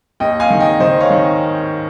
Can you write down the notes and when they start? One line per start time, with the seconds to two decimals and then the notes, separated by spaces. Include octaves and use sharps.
0.20 D#2 D#5 G5
0.40 F5 G#5
0.50 D#3
0.60 D#5 G5
0.80 D#3 C5 D#5
1.00 C#5 F5
1.10 D#3